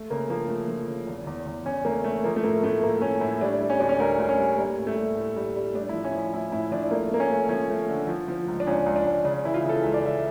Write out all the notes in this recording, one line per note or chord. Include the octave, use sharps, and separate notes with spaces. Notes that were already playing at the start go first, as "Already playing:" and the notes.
Already playing: A3
C#3 A#3
F3 A#3
A3
F3
C#3
E2
E2
E2
E2 C#4
A3 A#3
A3
F3 A#3
A3
A2 A#3
A2 A3
A2 A#3
A3 C#4
A2 E4
G3 D4
G3
C#4
D2 D4
C#4
D2 A#4
D2
C#4
G3
G3 A#3
A2
A3
G3
A2
G3
G3
A2 D4
E4
F3
C#4
F3
E4
A2 E4
A2 E4
F3 D4
A3 A#3
A3 A#3
C#4
A3
F3 C#4
A3
D3
F3
F3
C#2
D4
C#2 C#4
C#2
D4
C#2
C#3 D4
E3 E4
F4
C#3
A4
C#2 E5
D5
C#2 E5